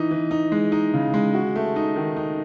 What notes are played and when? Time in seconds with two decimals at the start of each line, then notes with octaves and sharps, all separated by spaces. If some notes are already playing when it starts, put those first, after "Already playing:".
Already playing: E3 D#4
0.11 E3
0.31 D#4
0.52 G#3
0.72 D#4
0.94 C#3
1.14 G#3
1.34 F#4
1.56 A3
1.76 D#4
1.96 D#3
2.17 D#4